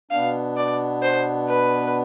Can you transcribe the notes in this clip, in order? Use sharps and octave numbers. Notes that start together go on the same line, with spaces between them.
B2 B3 D4 F5
D5
C5
B4